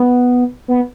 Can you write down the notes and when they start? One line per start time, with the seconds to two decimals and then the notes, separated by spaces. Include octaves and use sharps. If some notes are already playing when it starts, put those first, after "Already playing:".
Already playing: B3
0.68 B3